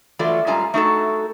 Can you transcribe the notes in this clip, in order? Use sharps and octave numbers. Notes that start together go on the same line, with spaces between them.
E3 F#3 A3 F4 D5
F#2 G3 G#3 F4 G#5 A#5
A3 D#4 F#4 A4